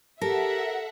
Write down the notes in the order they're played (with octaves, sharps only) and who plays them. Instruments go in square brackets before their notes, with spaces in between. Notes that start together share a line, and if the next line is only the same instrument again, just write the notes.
[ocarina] G4 [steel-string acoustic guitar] A4 [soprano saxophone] A#4 [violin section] E5 F#5